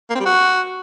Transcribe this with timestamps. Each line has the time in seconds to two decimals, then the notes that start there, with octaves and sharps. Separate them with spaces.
0.10 A#3
0.15 C4
0.20 G3
0.25 F#4